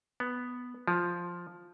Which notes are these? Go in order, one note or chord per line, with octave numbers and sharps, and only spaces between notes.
B3
F3